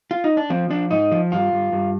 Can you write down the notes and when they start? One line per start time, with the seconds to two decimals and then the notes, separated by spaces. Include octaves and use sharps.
0.11 F4
0.24 D#4
0.37 D4
0.50 F3 C4
0.70 F3 D4
0.91 G#2 D#4
1.12 F3
1.32 G2 F4
1.52 G2
1.72 G2